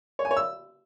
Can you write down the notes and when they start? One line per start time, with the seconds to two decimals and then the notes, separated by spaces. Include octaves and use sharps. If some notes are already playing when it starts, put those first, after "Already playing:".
0.19 C#5
0.25 G#5
0.31 C#5
0.37 E6